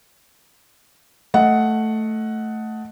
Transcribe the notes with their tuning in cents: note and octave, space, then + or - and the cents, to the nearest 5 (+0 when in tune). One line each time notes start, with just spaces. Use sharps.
A3 +0 D#5 +15 F#5 +0